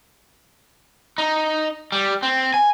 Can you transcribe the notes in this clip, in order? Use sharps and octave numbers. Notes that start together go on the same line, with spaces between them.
D#4
G3
C4
G#5